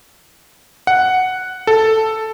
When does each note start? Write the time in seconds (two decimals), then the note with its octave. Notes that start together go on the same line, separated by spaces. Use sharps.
0.87 F#5
1.67 A4